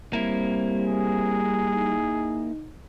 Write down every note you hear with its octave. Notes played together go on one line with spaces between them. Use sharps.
G3 A#3 C4 E4
G#4
D#4